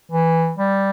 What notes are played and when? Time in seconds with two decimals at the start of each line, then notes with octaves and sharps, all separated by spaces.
0.12 E3
0.58 G3